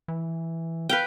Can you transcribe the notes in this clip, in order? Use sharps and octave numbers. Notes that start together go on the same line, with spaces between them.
E3
B4 F5 G5